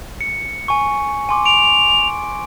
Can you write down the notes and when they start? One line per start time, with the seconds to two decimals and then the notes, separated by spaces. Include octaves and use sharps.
0.21 C#7
0.68 G#5 C#6
1.29 G#5 C6 D6
1.46 D7 F7